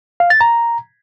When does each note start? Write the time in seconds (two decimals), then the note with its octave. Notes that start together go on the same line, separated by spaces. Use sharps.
0.20 F5
0.30 A6
0.41 A#5